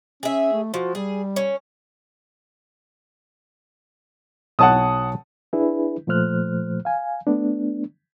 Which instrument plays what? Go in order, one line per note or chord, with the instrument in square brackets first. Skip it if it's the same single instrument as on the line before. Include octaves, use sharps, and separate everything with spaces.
[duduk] C#4 [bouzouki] G#4 E5
[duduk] A3
[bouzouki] F3 [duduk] F#4
[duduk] G3 [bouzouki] G#4
[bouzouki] C#4
[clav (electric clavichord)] B1 C#5 [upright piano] F#5 A5 D#6
[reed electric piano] D4 E4 G#4 B4
A#2 F3 A3 C5 F6 F#6
F5 G#5
A3 B3 D4